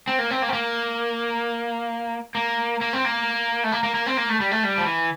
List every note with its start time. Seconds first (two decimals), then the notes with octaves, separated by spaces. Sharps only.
0.07 C4
0.19 A#3
0.31 C4
0.42 A#3
0.49 C4
0.53 A#3
2.35 A#3
2.81 A#3
2.93 C4
3.05 A#3
3.64 A3
3.72 A#3
3.83 A#3
3.94 A#3
4.06 C4
4.17 A#3
4.29 A3
4.40 G3
4.51 A3
4.63 G3
4.78 F3
4.86 E3